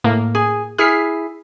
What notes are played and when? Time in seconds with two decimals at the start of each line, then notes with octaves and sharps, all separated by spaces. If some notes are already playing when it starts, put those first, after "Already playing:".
0.04 A2 A#3
0.35 G#4
0.78 E4 G#4 F6 B6 C7